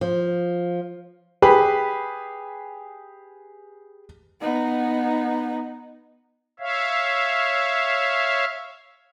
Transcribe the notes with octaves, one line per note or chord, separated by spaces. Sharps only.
F3
G4 G#4 B4
B3 D#4
C#5 E5 F5